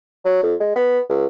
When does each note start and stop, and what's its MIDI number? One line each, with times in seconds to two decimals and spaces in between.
0.25 0.42 54
0.43 0.54 41
0.60 0.74 56
0.76 0.99 59
1.09 1.26 37